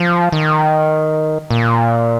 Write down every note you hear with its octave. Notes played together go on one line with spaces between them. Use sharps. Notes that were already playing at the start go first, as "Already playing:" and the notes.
Already playing: F3
D#3
A#2